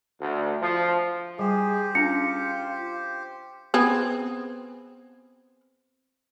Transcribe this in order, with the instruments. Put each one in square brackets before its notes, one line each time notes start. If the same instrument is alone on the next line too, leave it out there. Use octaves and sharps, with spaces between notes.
[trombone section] D2
F3
[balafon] G3 [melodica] G4 C5 [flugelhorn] G#4
[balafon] C#4 D4 [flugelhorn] F4 [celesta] C#7
[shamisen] B3 C4 G#4